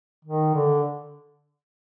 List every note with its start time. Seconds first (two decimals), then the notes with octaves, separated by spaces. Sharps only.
0.25 D#3
0.54 D3